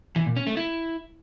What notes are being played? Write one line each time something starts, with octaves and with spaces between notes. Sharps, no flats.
E3
A#2
C#4
A3
E4